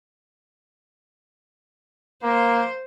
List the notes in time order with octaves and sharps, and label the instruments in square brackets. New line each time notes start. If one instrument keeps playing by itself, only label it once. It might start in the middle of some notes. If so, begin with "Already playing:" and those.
[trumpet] A#3 [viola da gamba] C5